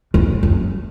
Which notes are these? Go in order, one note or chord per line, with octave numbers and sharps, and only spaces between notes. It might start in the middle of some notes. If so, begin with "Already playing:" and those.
E2
F#2